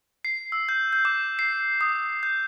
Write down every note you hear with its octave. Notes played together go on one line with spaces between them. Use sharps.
C7
E6
G6
G6
D6
C7
D#6
G6